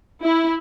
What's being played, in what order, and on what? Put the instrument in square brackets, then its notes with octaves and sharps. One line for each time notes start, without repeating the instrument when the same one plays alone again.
[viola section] E4